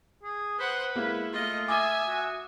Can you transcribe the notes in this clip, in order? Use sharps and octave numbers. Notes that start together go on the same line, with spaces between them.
G#4
B4 C5 F#5
G#3 A#3 E4
A3 F4 D#5
E5 G#5 D6 D#6 D#7
F#4